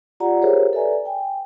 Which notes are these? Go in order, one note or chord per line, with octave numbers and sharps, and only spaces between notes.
F4 G4 D5 F#5 A#5
G4 G#4 A#4 C5 C#5 E5
A4 B4 D5 E5 G#5 A#5
G5 G#5